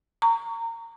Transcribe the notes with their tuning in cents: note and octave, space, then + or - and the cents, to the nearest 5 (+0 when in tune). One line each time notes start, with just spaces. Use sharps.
A#5 -25 C#6 +25